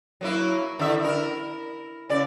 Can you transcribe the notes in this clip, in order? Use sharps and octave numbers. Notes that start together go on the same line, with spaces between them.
F#3 A#3 E4
D3 E4 E5
E4 A#4
C#3 D5